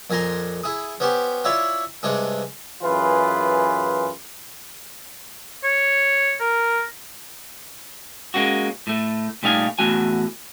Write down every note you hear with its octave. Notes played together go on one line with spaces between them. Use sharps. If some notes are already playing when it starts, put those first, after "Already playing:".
F2 A#2 G#5 A#5 C6
E4 G#4 D#6
B3 C#4 G4 C5
E4 F4 C#5 D5 E5
G2 C3 G#3 D4 G#4
F#2 E3 F4 G#4 B4
C#5
A#4
G#3 A#3 C#4 F#4
A2 A3
A#2 G3 A3 D#4 F5 G#5
E2 A2 A3 F#4 G#5